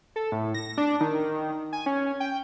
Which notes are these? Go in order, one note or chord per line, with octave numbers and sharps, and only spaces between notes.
A4
A2
A#6
D4
D#3
G#5
C#4
G5